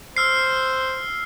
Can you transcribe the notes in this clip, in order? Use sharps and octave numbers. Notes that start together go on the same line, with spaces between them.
C5 E6 F6 C7